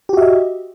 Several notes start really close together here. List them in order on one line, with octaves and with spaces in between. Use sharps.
G4 F#4 E5 D#5